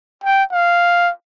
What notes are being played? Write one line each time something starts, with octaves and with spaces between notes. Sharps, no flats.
G5
F5